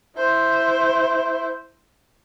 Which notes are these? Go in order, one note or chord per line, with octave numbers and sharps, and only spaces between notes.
E4 C5